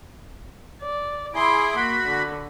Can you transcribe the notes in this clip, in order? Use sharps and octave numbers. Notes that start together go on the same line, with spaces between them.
D5
E4 G#4 B5 C6 D6
A#3 F#4 B5
D3